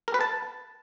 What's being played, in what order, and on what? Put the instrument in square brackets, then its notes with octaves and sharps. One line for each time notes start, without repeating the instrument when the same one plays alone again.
[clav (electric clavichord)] A#4
B4
A5